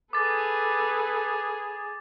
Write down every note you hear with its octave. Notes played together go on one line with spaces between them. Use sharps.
G#4 A4 B4 D6 A6